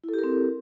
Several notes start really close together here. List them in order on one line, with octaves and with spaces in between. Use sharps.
E4 A4 G4 A#4 C4